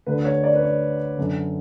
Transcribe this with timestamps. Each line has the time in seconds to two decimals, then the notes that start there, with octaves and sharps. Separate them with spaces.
0.06 D2 D3 B4
0.25 C#5
0.44 D5
0.54 B4
0.62 C#5
1.18 F#2 D3